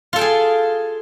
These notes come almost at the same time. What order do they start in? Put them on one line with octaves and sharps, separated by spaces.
F4 A4 G5 G#4